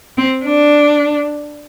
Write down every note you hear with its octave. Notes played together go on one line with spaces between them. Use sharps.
C4
D4